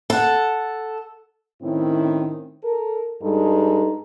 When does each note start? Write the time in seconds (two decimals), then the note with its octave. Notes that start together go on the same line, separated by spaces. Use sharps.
0.10 A4 F#5
1.62 A2 D#3 C4 C#4 E4
2.63 A4 A#4
3.22 G2 G#3 D#4 A4